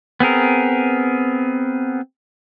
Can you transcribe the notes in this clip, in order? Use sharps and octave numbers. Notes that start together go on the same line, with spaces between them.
B3 C4 G#4 A#4